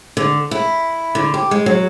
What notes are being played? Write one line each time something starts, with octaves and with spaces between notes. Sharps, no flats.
D3
E4
D3
G4
G#3
F#3